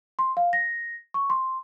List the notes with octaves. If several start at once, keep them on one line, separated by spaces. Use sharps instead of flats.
C6
F5
A#6
C#6
C6